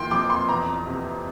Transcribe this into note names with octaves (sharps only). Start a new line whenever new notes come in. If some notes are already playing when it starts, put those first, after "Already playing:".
Already playing: A#2 E3 G5 C6
F2 D6
C6
E2 A#5
C3